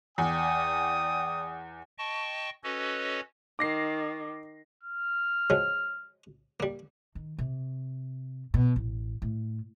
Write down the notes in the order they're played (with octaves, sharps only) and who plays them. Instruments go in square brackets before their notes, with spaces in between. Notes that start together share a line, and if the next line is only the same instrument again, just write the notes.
[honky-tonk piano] E2 [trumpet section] D5 G5 D#6
[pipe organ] D#5 G5 A5 C#6
C#4 F#4 A4 B4 C#5 D#5
[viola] D#3 [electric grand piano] D6 A#6 C7
[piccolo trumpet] F6
[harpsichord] F3 F#3 G#3
G3 A#3
[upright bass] D#3
C3
B2
A1
A2